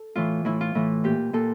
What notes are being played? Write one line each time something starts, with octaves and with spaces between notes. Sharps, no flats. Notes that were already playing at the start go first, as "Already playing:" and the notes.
Already playing: A4
A2 E3 F4
A2 E3 E4
F4
A2 E3
A#2 G4
A#2 A4